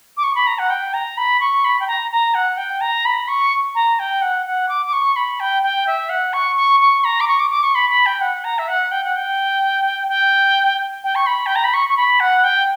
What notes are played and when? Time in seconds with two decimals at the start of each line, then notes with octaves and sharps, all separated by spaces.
0.17 D6
0.23 C#6
0.35 B5
0.47 A#5
0.59 F#5
0.70 G5
0.94 A#5
1.17 B5
1.40 C#6
1.64 B5
1.80 G5
1.88 A#5
2.11 A#5
2.34 F#5
2.57 G5
2.81 A#5
3.05 B5
3.28 C#6
3.75 A#5
3.99 G5
4.22 F#5
4.46 F#5
4.69 D6
4.86 D6
4.93 C#6
5.16 B5
5.40 G5
5.63 G5
5.87 E5
6.09 F#5
6.33 C#6
6.56 C#6
6.80 C#6
7.04 A#5
7.20 D6
7.28 C#6
7.39 D6
7.51 D6
7.63 C#6
7.75 B5
7.90 B5
8.06 G5
8.21 F#5
8.44 A#5
8.59 E5
8.68 F#5
8.91 G5
9.04 F#5
9.16 G5
10.09 G5
11.04 G5
11.15 C#6
11.26 B5
11.46 G5
11.55 A#5
11.64 B5
11.74 C#6
11.89 C#6
11.97 B5
12.20 F#5
12.44 G5